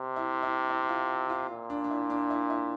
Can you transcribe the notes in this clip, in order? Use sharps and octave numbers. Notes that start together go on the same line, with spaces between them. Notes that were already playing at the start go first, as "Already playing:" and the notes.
Already playing: C3
E4
E4
E4
F4
F4
A#2
D4
D4
E4
D4
E4
E4